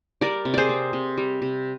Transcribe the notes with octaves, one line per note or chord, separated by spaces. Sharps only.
G3 A#4 D5
C3
G#4 C5 D5
C4
C3
G3
C3